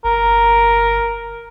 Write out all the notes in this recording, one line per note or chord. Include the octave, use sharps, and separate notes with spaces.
G1 A#4